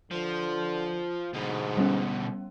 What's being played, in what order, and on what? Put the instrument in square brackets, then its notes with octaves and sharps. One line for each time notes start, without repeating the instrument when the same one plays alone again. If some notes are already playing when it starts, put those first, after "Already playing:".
[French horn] D3 [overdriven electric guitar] F3
[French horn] G#2 [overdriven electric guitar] B2 D3
[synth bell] G3 B3 C#4